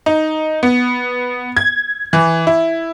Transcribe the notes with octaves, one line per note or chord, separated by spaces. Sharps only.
D#4
B3
G#6
E3
E4